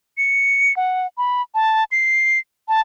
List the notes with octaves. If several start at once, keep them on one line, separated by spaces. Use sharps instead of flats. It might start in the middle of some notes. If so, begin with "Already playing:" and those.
C#7
F#5
B5
A5
C7
A5